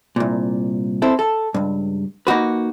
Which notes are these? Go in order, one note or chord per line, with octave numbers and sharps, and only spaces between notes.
C2 A#2
C4 E4 A4
A4
C#2 G2
A#3 D#4 F#4 B4